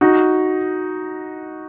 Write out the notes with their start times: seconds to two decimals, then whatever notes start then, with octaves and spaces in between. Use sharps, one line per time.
0.01 D#4 F#4